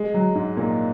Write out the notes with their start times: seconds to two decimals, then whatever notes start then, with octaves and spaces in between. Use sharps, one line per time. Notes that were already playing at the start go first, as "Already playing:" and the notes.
Already playing: G#3
0.14 F#3
0.35 G#2
0.57 A#2